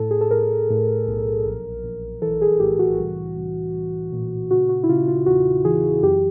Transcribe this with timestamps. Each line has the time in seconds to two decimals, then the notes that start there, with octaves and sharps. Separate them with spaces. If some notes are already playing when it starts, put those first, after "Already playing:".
Already playing: A2 A4
0.11 G#4
0.21 A4
0.31 A2 A#4
0.70 A2
1.07 B1
1.46 A#1
1.84 A#1
2.22 E3 A4
2.42 G#4
2.59 A2 G4
2.79 F#4
2.98 C2
3.37 C2
3.74 C2
4.12 A#2
4.51 C#3 F#4
4.69 F#4
4.83 E4
4.89 C#3 F4
5.08 F4
5.26 E2 F#4
5.65 E3 G#4
6.03 F#2 G4